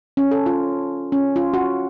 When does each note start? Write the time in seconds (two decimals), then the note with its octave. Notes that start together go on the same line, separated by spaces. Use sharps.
0.17 C#4
0.31 A4
0.46 F4
1.12 C#4
1.36 F4
1.54 F#4